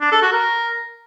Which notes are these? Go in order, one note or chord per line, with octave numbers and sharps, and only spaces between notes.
D4
A4
F#4
A#4